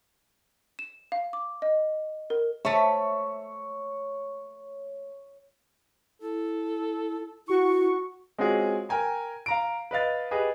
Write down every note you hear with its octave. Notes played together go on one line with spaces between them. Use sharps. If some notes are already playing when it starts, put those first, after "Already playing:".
E7
F5
D6
D#5
A#4
A3 C#5 E5
E4 A4
E4 F#4 C#6
G#3 C4 C#4 F4 F#4 G#4
A#4 G5 G#5 A#5
F5 A#5 D7
B4 D#5 F5 A6
G4 G#4 B4 D#5